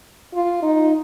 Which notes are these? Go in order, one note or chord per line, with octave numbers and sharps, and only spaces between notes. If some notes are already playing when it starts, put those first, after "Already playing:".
F4
D#4